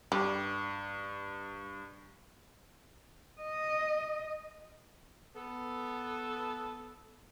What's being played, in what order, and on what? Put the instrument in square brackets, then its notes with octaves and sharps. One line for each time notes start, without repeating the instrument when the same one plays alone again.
[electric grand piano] G2 [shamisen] G3
[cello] D#5
[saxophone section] B3 A4